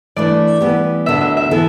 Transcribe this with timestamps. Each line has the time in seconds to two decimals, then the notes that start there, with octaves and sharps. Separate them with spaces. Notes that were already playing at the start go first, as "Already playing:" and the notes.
0.16 E3 A3 D4 B4 D5
0.61 E3 G3 B3 G4
1.06 D2 D3 B3 E5
1.21 E5
1.37 E5
1.51 E3 B3 E4 A4